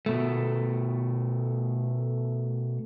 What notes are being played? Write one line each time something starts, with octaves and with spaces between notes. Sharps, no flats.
B2 A3